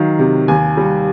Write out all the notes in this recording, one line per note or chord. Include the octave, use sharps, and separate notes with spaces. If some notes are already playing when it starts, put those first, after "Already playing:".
Already playing: D#3 F#3 F5
C3
D#2 G#5
G3